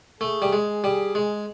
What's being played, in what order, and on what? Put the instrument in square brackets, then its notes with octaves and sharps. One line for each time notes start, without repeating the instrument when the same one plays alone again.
[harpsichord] A3 [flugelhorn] G#4
[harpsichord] G3
G#3
G3
G#3